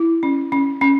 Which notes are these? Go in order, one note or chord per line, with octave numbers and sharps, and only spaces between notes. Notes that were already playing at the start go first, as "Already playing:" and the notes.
Already playing: E4
C#4
C#4
C#4